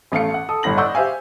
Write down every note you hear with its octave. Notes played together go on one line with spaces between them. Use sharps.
A1 A3 F5 C#7
F#5
A4 D#6
G1 A2 A#6 F#7
D5 D#5 F#5 C#6 E6 G6
G4 C5 E5 F5 G#5